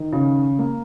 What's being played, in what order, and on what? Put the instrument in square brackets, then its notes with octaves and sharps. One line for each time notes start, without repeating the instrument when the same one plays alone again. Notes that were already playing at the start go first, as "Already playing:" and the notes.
Already playing: [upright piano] D#3
C#3
A#3